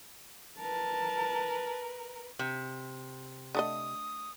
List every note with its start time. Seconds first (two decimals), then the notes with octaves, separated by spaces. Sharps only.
0.60 A#4 B4 A5
2.39 C3
3.55 D3 A3 D#5 D#6